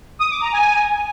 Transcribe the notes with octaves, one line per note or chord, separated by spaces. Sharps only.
D#6
D6
A#5
G#5